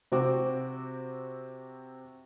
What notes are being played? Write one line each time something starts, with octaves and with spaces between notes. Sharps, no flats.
C3 C4 F#4 D6